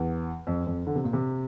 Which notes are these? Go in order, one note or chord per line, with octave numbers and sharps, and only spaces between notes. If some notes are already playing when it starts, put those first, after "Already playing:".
Already playing: E2
F2
F2
D3
C3
A#2
C3